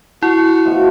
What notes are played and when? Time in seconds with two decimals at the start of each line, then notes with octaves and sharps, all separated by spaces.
0.23 E4 F#4
0.65 B2 F3 A3